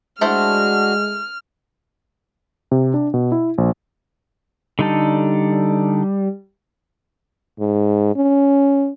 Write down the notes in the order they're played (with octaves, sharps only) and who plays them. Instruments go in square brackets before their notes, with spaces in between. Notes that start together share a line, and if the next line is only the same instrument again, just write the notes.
[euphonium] G#3 [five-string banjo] A3 E4 C5 [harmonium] D4 F#4 [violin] F6
[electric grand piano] C3
D4
B2
E4
A#1
[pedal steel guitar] D3 D#4 A4 [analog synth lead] G3
[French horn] G#2
C#4